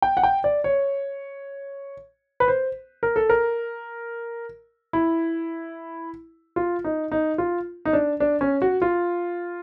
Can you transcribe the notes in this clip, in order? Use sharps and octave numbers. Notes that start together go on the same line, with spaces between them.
G5
F#5
G5
D5
C#5
B4
C5
A#4
A4
A#4
E4
F4
D#4
D#4
F4
D#4
D4
D4
C#4
F#4
F4